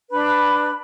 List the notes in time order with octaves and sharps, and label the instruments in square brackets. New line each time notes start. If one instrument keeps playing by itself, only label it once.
[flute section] D4 B4 B5